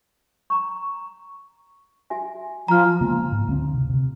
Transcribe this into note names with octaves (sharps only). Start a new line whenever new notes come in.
A#5 C#6
F#4 E5 G#5
F3 G#5 A#5 F6
C#3 G#3 A#3 B3
G#2
D2 A#3 C4
C3
C3